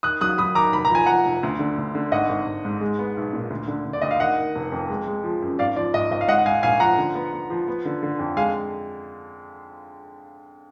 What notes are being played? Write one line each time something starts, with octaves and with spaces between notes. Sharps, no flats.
D#3 D#6 F#6
F#3 D#6 F#6
F#3 B5 D#6
D#3 A#5 D6
F1 B5
A#5
F3 G#5
F3 F#5 A#5
F1
D2
D3
D2
D3
G#1 D#5 F#5
G#1
G#1
G#2
G#3
B3
B1
A#2
D2
D3
D3
D5
D2 D#5
F5
D#3 D#5 F#5
D#3
F1
F2
G#3
G#3
F3
F#2
G#1 D5 F5
F3 D5
G#1 D#5
G#1 D#5
F5
G#2 D#5 F#5
F#5
G#2 F5 G#5
A#1 F5 G#5
F3 F#5 A#5
D3
B3
B3
F3
B3
D3
D3
F2
G#3 F5 G#5